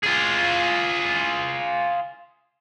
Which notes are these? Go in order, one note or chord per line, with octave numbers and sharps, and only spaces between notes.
F4 G#4